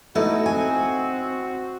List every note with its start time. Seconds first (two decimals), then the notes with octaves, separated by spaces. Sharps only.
0.15 A3 D#4 E4 F#4 B4
0.46 C4 G#5